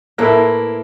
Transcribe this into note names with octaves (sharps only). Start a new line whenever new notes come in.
A2 A#3 E4 A4 B4